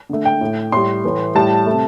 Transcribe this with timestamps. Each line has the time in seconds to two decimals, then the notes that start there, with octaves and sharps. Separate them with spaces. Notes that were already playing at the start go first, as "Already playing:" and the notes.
0.09 D3 A3
0.25 G5
0.41 A2 A3
0.72 A2 G3 C6
1.04 A2 E3 A3
1.35 A2 G3 A5
1.66 C3 A3